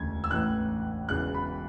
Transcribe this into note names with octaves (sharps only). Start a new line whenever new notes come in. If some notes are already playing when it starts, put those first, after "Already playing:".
Already playing: E1 D2 C#3 G#6
E6
A1 A2 E3 F#6
E1 E2 C#3 E3 F#6
B5